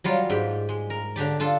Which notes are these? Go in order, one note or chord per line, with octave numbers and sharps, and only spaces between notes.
F#3 G3 F4
G#2 G4
G#3
A#4
D3 D4 G4 D5
D4 F4 A4